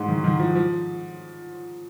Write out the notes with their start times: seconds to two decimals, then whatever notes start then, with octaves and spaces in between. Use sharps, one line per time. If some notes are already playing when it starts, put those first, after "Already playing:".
Already playing: G#2
0.08 D#3
0.24 D#3
0.40 F3
0.55 F3